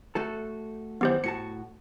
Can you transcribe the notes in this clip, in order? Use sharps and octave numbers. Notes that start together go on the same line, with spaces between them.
A3 F#4 A4
F#2 D#3 E3 B3 G4 C5
A2 F#4 A5 C#7